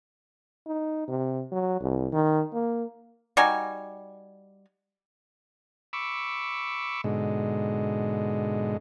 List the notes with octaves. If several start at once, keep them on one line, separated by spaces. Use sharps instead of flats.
D#4
C3
F#3
C2
D#3
A#3
G3 D#4 F#4 G#5
B5 C#6 D6 E6
G#2 B2 D3 G#3